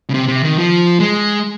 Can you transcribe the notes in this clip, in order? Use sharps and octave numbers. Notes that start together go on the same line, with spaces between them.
C#3
C3
C3
D#3
F3
G#3